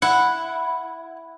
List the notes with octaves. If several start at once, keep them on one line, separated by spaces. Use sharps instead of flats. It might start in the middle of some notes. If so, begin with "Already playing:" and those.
E4 F#5